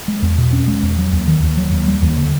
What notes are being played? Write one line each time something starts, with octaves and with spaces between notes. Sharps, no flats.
G#3
E2
B2
C#4
G#3
E2
F#3
D#2
D#3
D#2
F#3
D#2
G3
D#2
D3